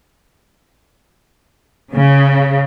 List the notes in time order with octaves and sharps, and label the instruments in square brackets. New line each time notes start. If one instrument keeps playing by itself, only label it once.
[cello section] C#3